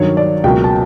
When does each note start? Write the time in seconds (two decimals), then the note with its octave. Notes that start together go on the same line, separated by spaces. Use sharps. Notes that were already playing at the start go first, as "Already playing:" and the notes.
Already playing: G2 D#3 F#3 C#5
0.17 D5
0.44 C#2 B2 F#3 A#3 G5
0.64 A5